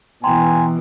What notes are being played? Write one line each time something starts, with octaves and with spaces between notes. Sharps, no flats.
B2 E3 G5 G#5 A#5 C6